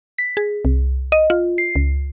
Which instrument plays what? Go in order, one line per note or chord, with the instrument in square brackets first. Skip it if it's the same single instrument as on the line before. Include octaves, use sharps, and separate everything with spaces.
[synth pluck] B6
G#4
C2
D#5
F4
C7
C#2